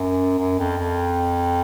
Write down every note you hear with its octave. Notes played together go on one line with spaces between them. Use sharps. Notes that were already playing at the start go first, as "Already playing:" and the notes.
Already playing: F#2
F#2
F2
F2